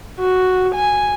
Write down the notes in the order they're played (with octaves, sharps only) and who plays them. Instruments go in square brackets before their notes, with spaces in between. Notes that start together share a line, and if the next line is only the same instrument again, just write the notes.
[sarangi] F#4
G#5